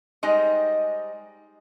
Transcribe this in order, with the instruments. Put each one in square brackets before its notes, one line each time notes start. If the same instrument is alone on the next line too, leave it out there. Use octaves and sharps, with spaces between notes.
[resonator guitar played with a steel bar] G3 G#3 D#4 C5 D#5